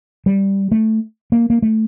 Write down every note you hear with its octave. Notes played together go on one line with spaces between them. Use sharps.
G3
A3
A#3
A#3
A3